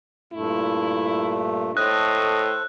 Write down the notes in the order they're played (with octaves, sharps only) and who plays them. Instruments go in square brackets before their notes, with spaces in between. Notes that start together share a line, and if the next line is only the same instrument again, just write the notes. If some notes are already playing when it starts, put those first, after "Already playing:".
[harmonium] G2 A#2 A3 [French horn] E4
[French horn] A2 [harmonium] A4 C5 [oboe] D#5 [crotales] F#6